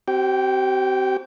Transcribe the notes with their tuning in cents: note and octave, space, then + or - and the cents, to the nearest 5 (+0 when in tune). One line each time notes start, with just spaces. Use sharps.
C4 +0 G4 -45 G5 +0